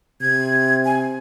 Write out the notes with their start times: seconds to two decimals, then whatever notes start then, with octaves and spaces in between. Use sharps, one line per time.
0.21 C3 G#6
0.85 G#5